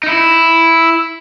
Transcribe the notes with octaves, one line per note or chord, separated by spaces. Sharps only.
D#4
E4